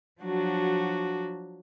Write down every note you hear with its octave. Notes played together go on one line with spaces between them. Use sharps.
F3 F#3 D4 F#4